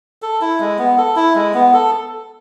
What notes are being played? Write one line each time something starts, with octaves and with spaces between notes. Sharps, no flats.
A4
E4
G#3
B3
A4
E4
G#3
B3
A4